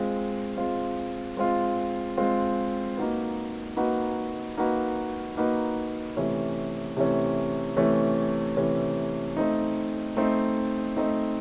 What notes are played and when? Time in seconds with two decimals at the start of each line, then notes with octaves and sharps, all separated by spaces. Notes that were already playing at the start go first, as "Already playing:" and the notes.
Already playing: G#3 C4 F4
0.57 G#3 C4 F4
1.37 G#3 C4 F4
2.17 G#3 C4 F4
2.97 A#3 D#4 F#4 B4
3.77 A#3 D#4 F#4 B4
4.57 A#3 D#4 F#4 B4
5.37 A#3 D#4 F#4 B4
6.17 C3 E3 A3 C#4
6.97 C3 E3 A3 C#4
7.76 C3 E3 A3 C#4
8.57 C3 E3 A3 C#4
9.37 A3 C4 D#4
10.17 A3 C4 D#4
10.97 A3 C4 D#4